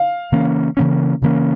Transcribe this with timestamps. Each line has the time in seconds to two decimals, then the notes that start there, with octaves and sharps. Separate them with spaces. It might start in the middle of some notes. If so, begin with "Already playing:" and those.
Already playing: F5
0.32 C#3 E3 A#3 C#4
0.77 C#3 E3 A#3 C#4
1.22 C#3 E3 A#3 C#4